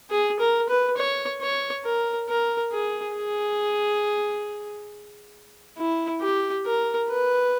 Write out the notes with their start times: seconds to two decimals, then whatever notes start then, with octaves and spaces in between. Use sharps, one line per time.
0.10 G#4
0.40 A#4
0.69 B4
0.97 C#5
1.42 C#5
1.85 A#4
2.29 A#4
2.72 G#4
3.17 G#4
5.78 E4
6.22 G4
6.66 A#4
7.10 B4